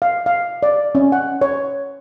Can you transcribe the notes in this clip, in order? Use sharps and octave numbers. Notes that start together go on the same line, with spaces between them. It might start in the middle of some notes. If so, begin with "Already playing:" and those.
F5
F5
D5
C#4
F#5
C#5